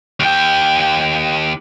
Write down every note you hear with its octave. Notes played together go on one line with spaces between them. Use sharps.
D#2 G5